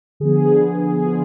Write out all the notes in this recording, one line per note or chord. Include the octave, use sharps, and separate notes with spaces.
D3 F3 B3 G#4
G#4
F4